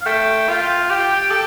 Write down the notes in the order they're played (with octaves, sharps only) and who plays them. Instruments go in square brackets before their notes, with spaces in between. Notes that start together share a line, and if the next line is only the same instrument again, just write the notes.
[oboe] F5
[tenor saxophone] A3 [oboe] G5
[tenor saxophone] F4
[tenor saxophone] G4 [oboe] G5
[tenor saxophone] A4